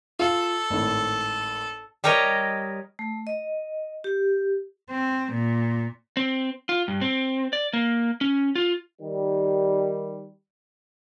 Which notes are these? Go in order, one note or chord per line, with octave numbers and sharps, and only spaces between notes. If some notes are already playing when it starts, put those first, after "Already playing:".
F4 A4
G#1 A2
G3 G4 A#4 C#5 D#5
A3
D#5
G4
C4
A#2
C4
F4
G2
C4
D5
A#3
C#4
F4
D#3 G3